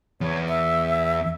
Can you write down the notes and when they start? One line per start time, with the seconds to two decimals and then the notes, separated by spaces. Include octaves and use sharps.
0.21 E2 C#5
0.49 E5